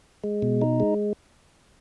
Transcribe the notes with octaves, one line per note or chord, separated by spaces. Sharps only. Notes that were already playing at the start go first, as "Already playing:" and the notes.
G#3
B2
D#4
G#3